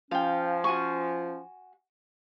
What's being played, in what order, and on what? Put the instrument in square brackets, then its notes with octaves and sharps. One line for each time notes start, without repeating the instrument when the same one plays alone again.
[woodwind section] F3 C#4 [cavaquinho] F5 G5
[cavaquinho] F#4 G#5 C#6